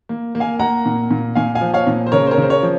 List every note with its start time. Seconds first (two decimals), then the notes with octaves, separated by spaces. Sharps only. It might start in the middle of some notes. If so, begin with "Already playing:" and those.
0.09 A#3
0.35 A#3
0.40 F5 G#5
0.59 A#3 F#5 A#5
0.86 A#2
1.11 A#2
1.35 A#2 F5 G#5
1.55 F5 G#5
1.61 F3
1.74 C#5 F5
1.87 A#2
2.07 C5
2.12 C#3 A#4 C#5
2.27 C5
2.31 A#4 C#5
2.38 C#3 C5
2.50 A#4 C#5
2.63 F3